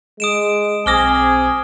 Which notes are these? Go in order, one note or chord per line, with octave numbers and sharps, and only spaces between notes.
G#3 D#6 D7 E7
B1 C4 G#4 D6 D#6 F6 A#6 G7